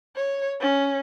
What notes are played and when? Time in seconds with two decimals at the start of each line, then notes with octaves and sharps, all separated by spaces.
0.16 C#5
0.61 C#4